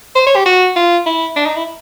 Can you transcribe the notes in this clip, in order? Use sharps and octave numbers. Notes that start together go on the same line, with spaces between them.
C5
C#5
G4
F#4
F4
E4
D4
D#4
E4